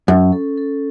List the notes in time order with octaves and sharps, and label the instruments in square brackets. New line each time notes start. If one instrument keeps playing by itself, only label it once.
[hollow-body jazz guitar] F#2 [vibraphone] C#4
[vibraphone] A4
A4